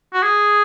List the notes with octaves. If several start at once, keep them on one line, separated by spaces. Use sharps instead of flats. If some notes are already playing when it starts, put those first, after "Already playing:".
F#4
G#4